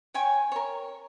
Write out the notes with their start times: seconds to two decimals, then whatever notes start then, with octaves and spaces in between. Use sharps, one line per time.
0.14 C#5 G5 G#5 C#6
0.52 A#4 C#5